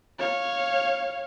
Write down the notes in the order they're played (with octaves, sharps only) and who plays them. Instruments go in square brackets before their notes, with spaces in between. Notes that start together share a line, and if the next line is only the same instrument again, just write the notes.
[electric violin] C#5 F5